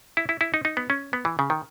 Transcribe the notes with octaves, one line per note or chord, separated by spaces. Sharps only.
E4
E4
E4
D#4
D#4
B3
C#4
B3
E3
C#3
D#3